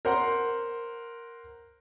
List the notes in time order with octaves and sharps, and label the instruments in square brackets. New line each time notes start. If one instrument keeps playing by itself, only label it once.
[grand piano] A#4 C5 F#5 C6